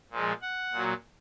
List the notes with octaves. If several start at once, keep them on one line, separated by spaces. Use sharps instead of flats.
A#2 F3 G#3
F#5
A#2 F#3